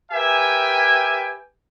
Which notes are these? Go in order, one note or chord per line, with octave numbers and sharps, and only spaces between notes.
G4 A#4 B4 E5 G5 G#5